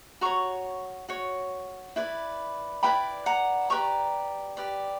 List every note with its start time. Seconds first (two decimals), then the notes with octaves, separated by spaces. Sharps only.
0.21 F#4 C#5 A#5 C#6
1.08 F#4 C#5
1.96 E4 B4 D5
2.83 E4 B4 D5 G5 B5
3.26 F#5 A#5
3.70 G4 B4 D5 A#5 C#6
4.57 G4 B4 D5